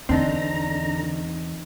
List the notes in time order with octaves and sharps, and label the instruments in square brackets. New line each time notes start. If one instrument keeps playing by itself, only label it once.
[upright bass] E2 [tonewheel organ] D3 A#5 [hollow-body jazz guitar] C4 D4 D#4